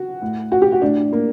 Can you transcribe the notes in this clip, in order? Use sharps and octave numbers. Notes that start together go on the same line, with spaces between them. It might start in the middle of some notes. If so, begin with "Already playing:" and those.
Already playing: F#4
A2
F#4
G4
F#4
A2 D4
A#3